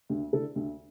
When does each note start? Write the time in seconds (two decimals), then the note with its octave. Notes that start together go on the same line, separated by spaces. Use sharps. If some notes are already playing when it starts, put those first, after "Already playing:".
0.10 D2
0.33 D3 A3 E4 A4
0.56 D2